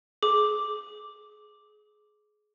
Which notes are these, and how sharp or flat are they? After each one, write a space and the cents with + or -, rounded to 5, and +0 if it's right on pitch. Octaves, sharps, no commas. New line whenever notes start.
G#4 +25 D6 +0